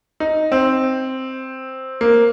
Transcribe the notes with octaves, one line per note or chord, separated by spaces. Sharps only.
D#4
C4
A#3